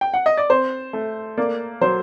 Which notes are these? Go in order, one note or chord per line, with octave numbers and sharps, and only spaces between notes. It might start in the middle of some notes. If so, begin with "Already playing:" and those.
G5
F#5
D#5
D5
C4 C5
A3
A#3 D5
F#3 C5